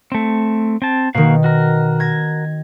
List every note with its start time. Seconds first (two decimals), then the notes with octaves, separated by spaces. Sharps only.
0.12 A3 C4
0.82 C4 A5
1.15 B2 D#3 A#3 F#4 F5
1.44 F#4 A#4
2.00 G#6 A#6